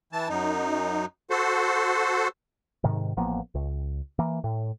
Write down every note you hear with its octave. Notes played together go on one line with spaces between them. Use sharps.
E3 A5
F#2 D#4
F#4 A4 C5
G#2 C3 D#3
A1 F3 A#3 B3
C#2
E3 A#3
A2